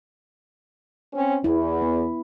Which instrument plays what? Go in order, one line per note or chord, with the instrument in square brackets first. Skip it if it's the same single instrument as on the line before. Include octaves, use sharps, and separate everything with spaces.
[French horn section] C4 C#4
[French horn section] E2 [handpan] E4
[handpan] B3